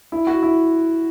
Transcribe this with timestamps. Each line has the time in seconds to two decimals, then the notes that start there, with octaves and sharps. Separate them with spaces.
0.12 E4
0.27 F#4
0.43 E4